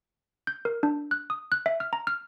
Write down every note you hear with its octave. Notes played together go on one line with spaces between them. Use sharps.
G6
A#4
D4
F#6
D#6
F#6
E5
F6
A#5
F6